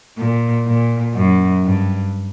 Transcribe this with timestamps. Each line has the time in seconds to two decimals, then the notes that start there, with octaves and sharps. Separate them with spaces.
0.17 A#2
0.66 A#2
1.15 F#2
1.64 G2